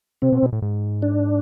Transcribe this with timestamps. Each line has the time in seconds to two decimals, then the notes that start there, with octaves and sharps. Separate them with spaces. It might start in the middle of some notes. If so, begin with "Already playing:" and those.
0.22 C3 C4
0.32 B2
0.43 B2
0.53 A2
0.62 G#2
1.02 D4